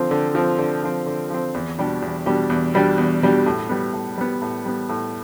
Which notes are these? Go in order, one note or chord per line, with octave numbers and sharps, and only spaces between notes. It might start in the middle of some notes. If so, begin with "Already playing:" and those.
Already playing: D3 F3 C4
D3
F3 C4
D3
F3 C4
D3
F3 C4
E2
B2 G3 D4 G4
E2
B2 G3 D4 G4
E2
B2 G3 D4 G4
E2
B2 G3 D4 G4
A2
G3 B3
A2
G3 B3
A2
G3 B3
A2